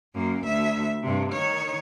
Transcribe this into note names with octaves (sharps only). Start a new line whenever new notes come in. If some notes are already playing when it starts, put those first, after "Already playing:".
F#2 A#3
D2 E5
G2 C3
D#3 C#5